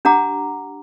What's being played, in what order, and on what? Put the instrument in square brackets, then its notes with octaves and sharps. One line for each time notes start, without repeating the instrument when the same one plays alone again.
[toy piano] D4 G4 F#5 A#5 D6